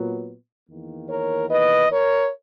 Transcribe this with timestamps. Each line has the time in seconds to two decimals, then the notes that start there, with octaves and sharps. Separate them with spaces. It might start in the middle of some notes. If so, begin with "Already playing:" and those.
Already playing: A#2 F#3 B3
0.67 E2 D#3 A#3
1.09 A#4 C#5
1.50 B4 D#5
1.92 A#4 C#5